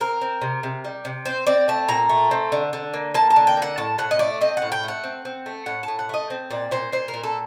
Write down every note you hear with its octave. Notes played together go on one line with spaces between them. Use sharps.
C4 A#4
C4
C3
C3
G3
C3
C4 C5
C4 D5
A3 A5
A#2 A#5
A3
C4
D3
D3
A#3
A#3 A5
A5
D3
G5
A#3
F#5
A2 A5
A2 F#5
D#5
A3 D5
C4 D#5
A2 F#5
G5
A3 F#5
C4
C4
A3
A2 F#5
A5
A2
F#5
A3 D#5
C4
A#2 D5
A#2 C5
A#2 C5
A#4
A#2
A4